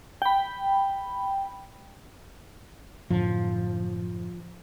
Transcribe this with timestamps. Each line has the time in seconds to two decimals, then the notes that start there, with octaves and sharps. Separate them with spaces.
0.22 G5 B5
3.10 F#2 A2 D3 F3